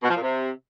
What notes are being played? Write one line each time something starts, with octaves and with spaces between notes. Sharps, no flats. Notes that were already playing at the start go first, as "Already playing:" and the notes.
B2
F3
A#2
C3